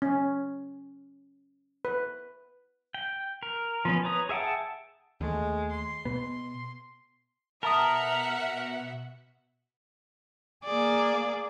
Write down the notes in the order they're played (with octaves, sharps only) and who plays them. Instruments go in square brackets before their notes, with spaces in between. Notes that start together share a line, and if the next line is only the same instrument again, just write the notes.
[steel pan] C#4
B4
[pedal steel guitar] G5
A#4
F3 B3 C#4
B4 C#5 A#5 D#6
G#4 E5 F#5 G5 A5
[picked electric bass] D#2 A3 [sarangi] G#3
[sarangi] C6
[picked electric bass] B2 B3
[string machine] B2 [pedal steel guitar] A#4 [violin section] E5 F#5 [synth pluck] A5 A#5 D#6
[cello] A#3 G#4 [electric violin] D5